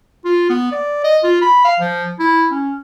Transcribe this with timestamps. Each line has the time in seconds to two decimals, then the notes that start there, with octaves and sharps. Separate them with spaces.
0.25 F4
0.50 B3
0.72 D5
1.04 D#5
1.23 F4
1.42 B5
1.64 F5
1.80 F3
2.19 E4
2.51 C#4